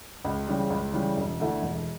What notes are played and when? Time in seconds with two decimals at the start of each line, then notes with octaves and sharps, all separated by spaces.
0.24 C#2
0.47 C#3 E3 G3
0.70 C#2
0.93 C#3 E3 G3
1.17 E1
1.39 D2 D3 A3 E4
1.62 E1